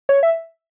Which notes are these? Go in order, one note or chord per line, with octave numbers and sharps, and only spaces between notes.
C#5
E5